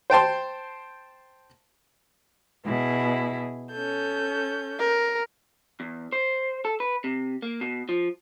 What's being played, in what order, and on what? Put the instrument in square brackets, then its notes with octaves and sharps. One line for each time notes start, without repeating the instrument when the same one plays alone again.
[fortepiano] C5 G5 A5 C6
[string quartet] B2 E4 G#4
C#4 A4 G6
[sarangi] A#4
[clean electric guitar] E2
C5
A4
B4
C3
A#3
B2
F3